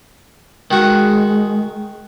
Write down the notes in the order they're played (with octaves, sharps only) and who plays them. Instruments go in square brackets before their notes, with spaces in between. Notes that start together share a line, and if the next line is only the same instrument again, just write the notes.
[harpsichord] D#3 F#4 [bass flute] G#3